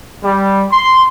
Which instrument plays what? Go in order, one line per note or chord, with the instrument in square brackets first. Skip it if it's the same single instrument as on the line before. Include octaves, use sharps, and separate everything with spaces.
[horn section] G3
C6